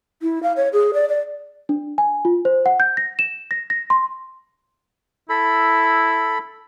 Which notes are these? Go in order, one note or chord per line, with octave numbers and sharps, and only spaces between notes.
E4
F5
C#5
G#4
D5
D5
D4
G#5
F4
C5
F#5
G6
A#6
E7
A#6
A#6
C6
E4 A4 B5